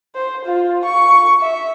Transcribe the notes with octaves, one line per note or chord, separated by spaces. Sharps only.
C5
F4
C#6
E5